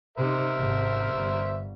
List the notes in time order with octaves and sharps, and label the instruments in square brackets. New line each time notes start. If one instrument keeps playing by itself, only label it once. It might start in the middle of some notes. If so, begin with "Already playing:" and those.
[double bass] C3 D#4 [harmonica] A#4 C5 E5
[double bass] G#1 C3
G1